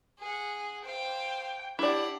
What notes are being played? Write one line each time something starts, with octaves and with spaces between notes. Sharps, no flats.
G#4 F#5
C5 F5 G5
D4 E4 G4 D5 F#5